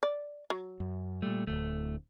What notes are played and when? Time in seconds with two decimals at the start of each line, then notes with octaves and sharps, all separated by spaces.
0.03 D5
0.50 F#3
0.80 F#2
1.22 A#2 G3 A3
1.47 D1 G1 D2 A3